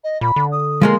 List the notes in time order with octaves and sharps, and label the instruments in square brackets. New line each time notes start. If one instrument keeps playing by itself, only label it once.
[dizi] D#5
[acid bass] A#2 [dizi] B5
[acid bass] D3
[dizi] D#6
[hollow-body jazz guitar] F3 G#3 A#3 [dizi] C6